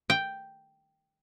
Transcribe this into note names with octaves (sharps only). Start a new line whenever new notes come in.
G5